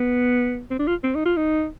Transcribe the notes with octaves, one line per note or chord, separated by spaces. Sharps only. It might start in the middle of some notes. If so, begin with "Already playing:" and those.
Already playing: B3
C4
D4
F4
C4
D#4
F4
D#4